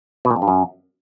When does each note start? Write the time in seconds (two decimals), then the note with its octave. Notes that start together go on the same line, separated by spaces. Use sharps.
0.25 B2
0.31 A#2
0.36 F2
0.42 G2
0.48 F#2